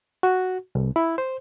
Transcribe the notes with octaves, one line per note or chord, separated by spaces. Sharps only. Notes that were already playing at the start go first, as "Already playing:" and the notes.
F#4
C2
E4
C5